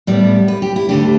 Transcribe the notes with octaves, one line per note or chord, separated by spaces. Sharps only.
A2 G3 B3 D5
B4
G4
E4
D2 D3 A3 D4 G4